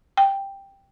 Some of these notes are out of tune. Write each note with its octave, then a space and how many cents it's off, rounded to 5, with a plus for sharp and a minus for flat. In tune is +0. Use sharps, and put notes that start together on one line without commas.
G5 +5